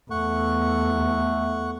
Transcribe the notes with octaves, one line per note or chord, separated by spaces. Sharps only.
E2 A3 F#5 C#6